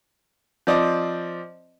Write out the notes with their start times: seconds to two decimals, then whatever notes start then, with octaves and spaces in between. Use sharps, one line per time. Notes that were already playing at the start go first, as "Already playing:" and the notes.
0.67 F3 C4 D5 D#5